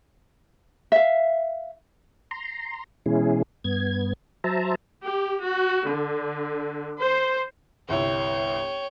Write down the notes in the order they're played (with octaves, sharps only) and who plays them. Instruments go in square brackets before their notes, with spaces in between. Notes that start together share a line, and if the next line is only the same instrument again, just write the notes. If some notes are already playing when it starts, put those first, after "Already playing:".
[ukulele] E5 F5
[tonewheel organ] A#5 C6
B2 E3 G#3 C#4 E4 G#4
G2 B3 G#6
F#3 C5 E5 A5 A#5
[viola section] G4
F#4
D3
C5
[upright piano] G1 C2 E4 [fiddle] C#5 G5